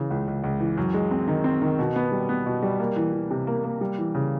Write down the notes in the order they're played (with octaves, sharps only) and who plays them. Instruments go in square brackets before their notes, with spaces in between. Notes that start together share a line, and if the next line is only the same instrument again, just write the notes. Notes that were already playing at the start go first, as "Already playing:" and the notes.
Already playing: [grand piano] C#3 E3
C#2
C#2
C#2
E3
F#2
G#3
C4
D#3
C4
D#3
B2
B3
G3
B3
B2
G3
A#3
E3
E3
C3
A#3
A#3
G3
E3
C#3